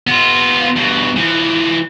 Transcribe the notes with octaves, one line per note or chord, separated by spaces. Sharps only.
B3 F4
G2 B2
E3 F3